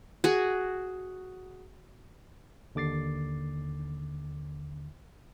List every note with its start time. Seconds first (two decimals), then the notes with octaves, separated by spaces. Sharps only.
0.24 F#4 G#4
2.75 D#2 D3 D6 A6 C7